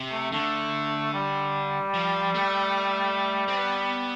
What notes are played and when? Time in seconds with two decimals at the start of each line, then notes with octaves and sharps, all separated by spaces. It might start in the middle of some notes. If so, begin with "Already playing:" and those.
Already playing: C3
0.12 A3
0.32 D3 A3
1.14 G3
1.94 F3
2.35 A3
3.48 C4
3.57 B3